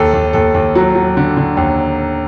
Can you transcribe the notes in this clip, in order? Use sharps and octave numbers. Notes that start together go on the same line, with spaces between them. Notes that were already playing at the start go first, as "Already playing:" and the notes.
Already playing: D#2 A4
D#2
D#2 A4
D#2
F#3
F#3
D3
D3
D#2